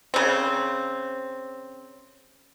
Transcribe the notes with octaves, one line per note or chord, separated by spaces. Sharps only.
C#3 C4